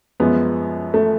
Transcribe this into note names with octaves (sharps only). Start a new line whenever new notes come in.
F#2 F3 G#3 B3
A3